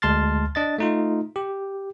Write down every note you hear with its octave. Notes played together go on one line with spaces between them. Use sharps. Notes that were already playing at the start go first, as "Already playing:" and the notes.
D2 G#3 A5 C6 F6 A6
D4 D#5 A6
A3 D#4 F4
G4